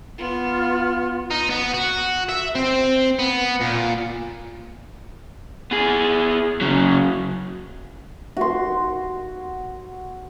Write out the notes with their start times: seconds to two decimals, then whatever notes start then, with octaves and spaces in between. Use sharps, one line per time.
0.18 B3 F4
1.31 D#4
1.50 B3
1.74 F#4
2.29 E5
2.55 C4
3.19 B3
3.61 A#2
5.71 B3 G#4
6.61 C#3 F#3
8.37 F#4 C6